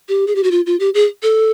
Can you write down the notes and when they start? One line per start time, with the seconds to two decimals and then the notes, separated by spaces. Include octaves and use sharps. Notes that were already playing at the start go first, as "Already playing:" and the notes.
0.09 G4
0.27 G#4
0.35 G4
0.43 F#4
0.51 F4
0.66 F4
0.80 G4
0.94 G#4
1.23 A4